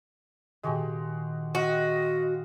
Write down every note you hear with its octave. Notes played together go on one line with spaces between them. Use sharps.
A#2 D#3 G#3 F#4 G4
F#4 D#5 F5 G5 C6 D#6